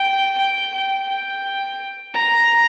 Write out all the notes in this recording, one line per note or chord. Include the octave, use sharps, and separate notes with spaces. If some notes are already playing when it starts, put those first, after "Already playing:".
Already playing: G5
G5
G5
G5
A#5